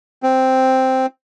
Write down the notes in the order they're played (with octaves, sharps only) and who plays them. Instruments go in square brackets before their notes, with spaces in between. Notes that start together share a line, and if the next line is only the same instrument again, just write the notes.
[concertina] C4